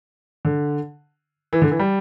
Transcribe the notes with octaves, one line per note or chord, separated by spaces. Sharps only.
D3
E3
D3
E3
G3